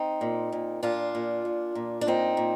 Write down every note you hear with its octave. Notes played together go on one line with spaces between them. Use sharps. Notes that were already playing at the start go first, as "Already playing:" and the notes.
Already playing: C4 D#4
A#2
A#2
A#2 D4 F4
A#2
A#2
A#2
D4
A#2 C4 D#4
A#2